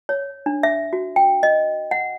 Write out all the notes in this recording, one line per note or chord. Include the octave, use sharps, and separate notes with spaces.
C#5
D4
E5
F#4
G5
D#5
F#5